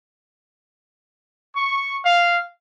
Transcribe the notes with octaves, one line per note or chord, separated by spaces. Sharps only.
C#6
F5